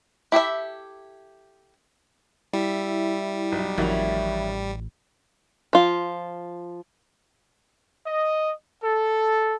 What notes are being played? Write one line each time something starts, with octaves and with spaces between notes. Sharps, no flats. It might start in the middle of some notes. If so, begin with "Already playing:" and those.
E4 G4 A4 E5
G3 E4 E5
B1
A1 F2 D#3 F#3 E4 C#5
F3 F4
D#5
A4